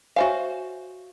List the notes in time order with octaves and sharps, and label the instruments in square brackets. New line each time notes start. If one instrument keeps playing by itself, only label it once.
[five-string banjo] F#4 C5 F5 [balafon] C#5 E5 G#5